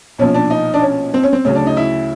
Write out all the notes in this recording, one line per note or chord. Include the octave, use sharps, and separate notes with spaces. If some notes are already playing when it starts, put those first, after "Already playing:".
B1 A#2 F3 C#4
D4
D#4
D4
C#4
C4
C#4
C4
D2 C#3 F#3 C#4
D4
D#4
E4